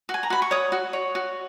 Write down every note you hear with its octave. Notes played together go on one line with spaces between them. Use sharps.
F#4
G#5
A#5
F#4 B5
C#6
C#5 D#6
F#4
C#5
F#4